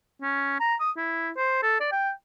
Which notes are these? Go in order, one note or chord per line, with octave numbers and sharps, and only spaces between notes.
C#4
A#5
D#6
E4
C5
A4
D5
G5